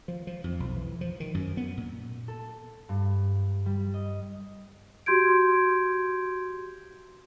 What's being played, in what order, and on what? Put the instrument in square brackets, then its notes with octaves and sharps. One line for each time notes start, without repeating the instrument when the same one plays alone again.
[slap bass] F3
F3
F2
B1
E3
F3
D#3
F#2
B3
A#2
[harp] A4
G2
G3
D#5
[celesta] F#4 G4 C6 G6 G#6 D7